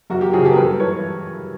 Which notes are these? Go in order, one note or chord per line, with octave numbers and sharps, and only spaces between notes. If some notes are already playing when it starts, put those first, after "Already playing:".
F#2 F#4
G4
C#3 F3 F#4 G#4
G4 A4
A#4
G2 A4 B4
E3 B4 C#5